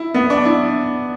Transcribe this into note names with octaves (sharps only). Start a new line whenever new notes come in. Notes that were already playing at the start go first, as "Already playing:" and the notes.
Already playing: E4
B3
D4
E4